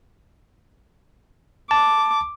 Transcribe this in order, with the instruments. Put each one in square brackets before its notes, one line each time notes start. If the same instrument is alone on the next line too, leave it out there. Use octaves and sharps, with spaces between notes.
[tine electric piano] A5 [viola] D6